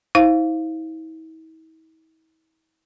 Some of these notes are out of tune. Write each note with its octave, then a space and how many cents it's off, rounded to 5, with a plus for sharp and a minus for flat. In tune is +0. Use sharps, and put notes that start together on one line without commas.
E4 -45 C5 +10 F5 -10